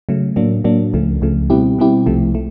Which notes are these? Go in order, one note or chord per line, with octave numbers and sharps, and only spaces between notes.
C#3 F#3 A3
A2 F#3 A#3 D4
A2 F#3 A#3 D4
C#2 C#3 F3 A3
C#2 C#3 F3 A3
B2 G3 C4 E4 G4
B2 G3 C4 E4 G4
C2 C3 F3 A3
A3